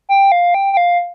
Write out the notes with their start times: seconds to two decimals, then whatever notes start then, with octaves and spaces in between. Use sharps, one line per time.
0.09 G5
0.32 F5
0.54 G5
0.73 G5
0.77 F5